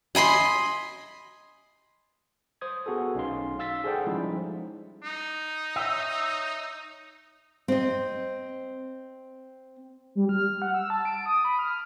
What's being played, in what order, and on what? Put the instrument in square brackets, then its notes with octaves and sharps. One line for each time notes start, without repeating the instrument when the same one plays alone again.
[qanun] D#5 G#5 B5 C6
[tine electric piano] C5 D#6 G#6
B3 F#4 G#4 A4
B1 C#4 D#4 F5 C6
F5 E6 A6 B6
G#4 A4 C5 D5 F#5 G5
F3 G3 G#3 C#4 D#4 E4
[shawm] D#4
[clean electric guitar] C#5 D#5 E5
[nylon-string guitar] C4 D#5
[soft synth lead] G3
F6
F#5
E6
A5
D7
D#6
B5
F6